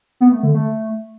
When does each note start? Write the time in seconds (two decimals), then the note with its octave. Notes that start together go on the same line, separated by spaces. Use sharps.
0.20 B3
0.32 A3
0.43 D3
0.54 A3